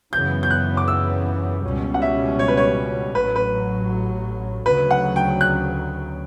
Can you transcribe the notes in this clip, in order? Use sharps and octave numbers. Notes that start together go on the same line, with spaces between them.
F#2 C#3 E3 B3 G6
G6
F#6
D6
E6
C#2 B2 G3 C#4
F#5
E5
C#5
B4
C#5
A1 A2 F#3 B4
B4
D2 C#3 F#3 B4
F#5
G5
F#6